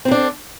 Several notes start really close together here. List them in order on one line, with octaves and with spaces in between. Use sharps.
C4 B3 D4 A4